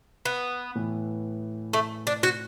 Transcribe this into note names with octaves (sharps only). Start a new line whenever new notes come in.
B3
A2 E3 B3
A3
D4
F#4